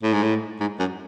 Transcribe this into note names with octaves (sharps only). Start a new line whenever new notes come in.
A2
G#2
A2
G#2
F#2